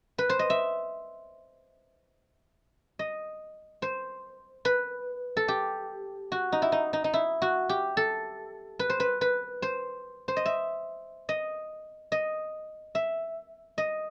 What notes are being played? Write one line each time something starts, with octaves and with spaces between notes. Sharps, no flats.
B4
C5
D#5
E5
D#5
C5
B4
A4
G4
F#4
D#4
E4
D#4
D#4
D#4
E4
F#4
G4
A4
B4
C5
B4
B4
C5
C5
D#5
E5
D#5
D#5
E5
D#5